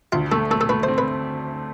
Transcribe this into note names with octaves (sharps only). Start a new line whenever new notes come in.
D2 F4
A3 A4
A3 A4
A4
A3 B4
C5
C4
B4